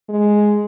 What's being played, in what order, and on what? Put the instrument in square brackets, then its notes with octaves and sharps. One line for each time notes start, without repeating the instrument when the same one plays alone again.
[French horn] G#3